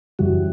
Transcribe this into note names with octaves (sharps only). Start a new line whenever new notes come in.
F#2 C#3 E3 G3 F#4